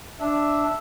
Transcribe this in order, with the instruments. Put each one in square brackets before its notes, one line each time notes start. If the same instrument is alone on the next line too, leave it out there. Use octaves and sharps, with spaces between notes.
[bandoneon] D4 [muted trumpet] E5